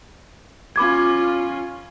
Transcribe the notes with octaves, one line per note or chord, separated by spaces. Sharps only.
C#4 F4 B5 D6 G#6